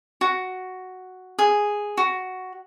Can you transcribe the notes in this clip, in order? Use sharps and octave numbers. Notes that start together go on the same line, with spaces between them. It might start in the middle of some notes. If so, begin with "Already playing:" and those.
F#4
G#4
F#4